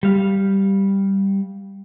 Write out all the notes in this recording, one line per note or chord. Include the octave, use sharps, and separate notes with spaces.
G3 F5